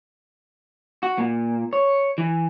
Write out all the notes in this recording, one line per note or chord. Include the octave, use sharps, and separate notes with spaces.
F#4
A#2
C#5
E3